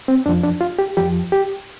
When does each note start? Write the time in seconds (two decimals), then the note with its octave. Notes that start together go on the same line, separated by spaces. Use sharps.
0.08 C4
0.26 F2 F3 D4
0.43 D4
0.61 F4
0.79 G4
0.97 F2 F3 G4
1.32 G4